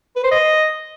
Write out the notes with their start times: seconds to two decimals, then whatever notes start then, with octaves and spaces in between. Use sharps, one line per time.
0.16 B4
0.24 C5
0.32 D#5